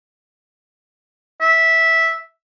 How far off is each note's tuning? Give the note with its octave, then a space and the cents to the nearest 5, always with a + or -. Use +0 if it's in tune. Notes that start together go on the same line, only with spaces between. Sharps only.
E5 -10